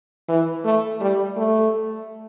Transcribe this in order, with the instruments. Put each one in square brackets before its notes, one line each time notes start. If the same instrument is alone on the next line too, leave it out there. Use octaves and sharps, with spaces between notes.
[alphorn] E3
A3
G3
A3